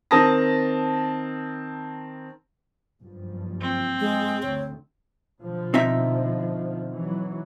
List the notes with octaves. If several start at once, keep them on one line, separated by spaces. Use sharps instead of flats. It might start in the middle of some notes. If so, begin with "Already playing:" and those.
D#3 C4 A#4 A5 D#6 A#6
F#1 G2 F3
C4
G#3
D2 C#5
B2 D3 F3
C4 D#4 E5
E3 F#3